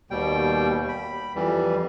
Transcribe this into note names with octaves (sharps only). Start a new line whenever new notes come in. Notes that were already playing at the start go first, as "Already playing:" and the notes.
D#2 B2 G3 G5
B5
F2 E3 G3